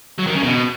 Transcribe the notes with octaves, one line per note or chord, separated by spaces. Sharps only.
F#3
D#3
C#3
B2